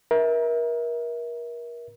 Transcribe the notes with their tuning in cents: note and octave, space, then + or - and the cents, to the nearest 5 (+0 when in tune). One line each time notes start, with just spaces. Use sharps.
A#4 +30 E5 -20